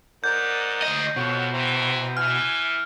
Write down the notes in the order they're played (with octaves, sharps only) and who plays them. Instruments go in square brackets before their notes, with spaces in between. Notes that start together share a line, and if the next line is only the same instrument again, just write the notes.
[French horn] G#2 [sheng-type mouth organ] A#4 D5 F#5 [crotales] G6
[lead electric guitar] D2 D#5
[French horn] F2 [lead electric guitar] B2 [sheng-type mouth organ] C#5 F#5 C#6
[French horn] E3 [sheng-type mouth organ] C5 G5 A#5
[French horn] E3 [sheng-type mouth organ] G#5 [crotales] F6